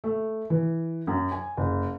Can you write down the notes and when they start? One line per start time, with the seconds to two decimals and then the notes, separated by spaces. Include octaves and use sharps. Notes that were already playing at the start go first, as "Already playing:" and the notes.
0.04 A3
0.50 E3
1.07 F#2
1.32 G#5
1.57 F#1